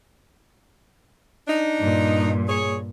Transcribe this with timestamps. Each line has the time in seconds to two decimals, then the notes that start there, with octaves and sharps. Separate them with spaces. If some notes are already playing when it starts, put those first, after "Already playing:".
1.47 D4 D#4
1.79 G2 A#2
2.49 G#4 C#5